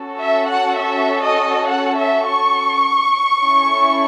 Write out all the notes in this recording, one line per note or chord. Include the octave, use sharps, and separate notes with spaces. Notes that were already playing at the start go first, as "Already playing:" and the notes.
Already playing: C#4 F#4 A4
E5
F#5
E5
D#5
F#5
E5
C#6
C#4 E4 A4